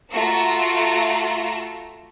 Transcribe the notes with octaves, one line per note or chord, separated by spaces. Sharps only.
A3 F4 F#4 A#5 E6